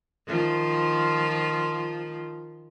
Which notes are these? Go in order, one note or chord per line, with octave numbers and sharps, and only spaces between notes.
D#3 F3 F4